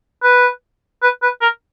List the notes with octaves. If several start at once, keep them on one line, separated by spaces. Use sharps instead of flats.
B4
B4
B4
A#4